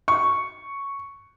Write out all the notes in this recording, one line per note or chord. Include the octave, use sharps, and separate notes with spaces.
C#6